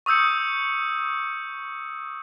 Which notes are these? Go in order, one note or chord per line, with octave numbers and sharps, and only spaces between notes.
C#6 D#6 E6 G6 C#7